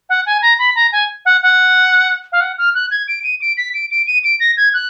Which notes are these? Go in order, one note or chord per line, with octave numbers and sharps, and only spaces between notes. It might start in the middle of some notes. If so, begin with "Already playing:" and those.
F#5
G#5
A#5
B5
A#5
G#5
F#5
F#5
F5
F#5
F6
F#6
G#6
D7
D#7
D7
B6
D7
D7
D#7
D7
A#6
G#6
F#6